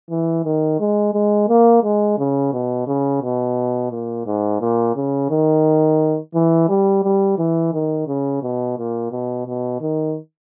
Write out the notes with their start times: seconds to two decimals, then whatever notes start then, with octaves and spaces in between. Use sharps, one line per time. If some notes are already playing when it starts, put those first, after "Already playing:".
0.10 E3
0.44 D#3
0.80 G#3
1.14 G#3
1.48 A#3
1.83 G#3
2.18 C#3
2.53 B2
2.87 C#3
3.22 B2
3.91 A#2
4.26 G#2
4.61 A#2
4.96 C#3
5.30 D#3
6.35 E3
6.69 G3
7.04 G3
7.38 E3
7.73 D#3
8.07 C#3
8.42 B2
8.77 A#2
9.11 B2
9.46 B2
9.81 D#3